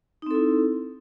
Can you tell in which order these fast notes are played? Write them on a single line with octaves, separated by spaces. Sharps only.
D#4 C4 A4 E4